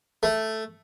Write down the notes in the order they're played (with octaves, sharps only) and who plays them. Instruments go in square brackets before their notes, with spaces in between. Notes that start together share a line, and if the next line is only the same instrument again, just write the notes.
[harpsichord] A3